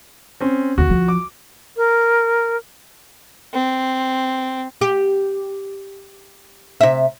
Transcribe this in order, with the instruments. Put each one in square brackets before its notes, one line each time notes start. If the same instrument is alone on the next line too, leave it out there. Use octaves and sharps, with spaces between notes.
[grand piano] C4 C#4
[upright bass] D#2 [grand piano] F#4
[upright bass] F3
[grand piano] D6
[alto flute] A#4
[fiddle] C4
[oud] G4
C3 E5